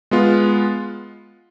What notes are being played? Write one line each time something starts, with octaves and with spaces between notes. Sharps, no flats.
G#3 B3 F4